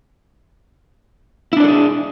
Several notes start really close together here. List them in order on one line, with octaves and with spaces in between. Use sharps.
E4 D4 D5 A4 G#4